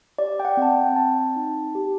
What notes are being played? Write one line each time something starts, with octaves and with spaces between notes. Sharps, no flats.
G4 D5
G5
F#5
C4 A5
G5
C4 A5
D#4
G4